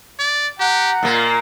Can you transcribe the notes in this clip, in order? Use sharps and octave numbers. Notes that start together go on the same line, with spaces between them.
D5
G4 F#5 A#5
A#2 A#3 F4